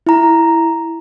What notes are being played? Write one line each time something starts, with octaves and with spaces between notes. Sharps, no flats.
E4 A#5